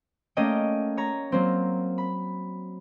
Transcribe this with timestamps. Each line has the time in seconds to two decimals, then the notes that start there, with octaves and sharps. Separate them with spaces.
0.37 A3 A#3 C#4 D5 D#5 G5
0.97 C#5 A#5
1.32 F#3 A#3 C4
1.98 B5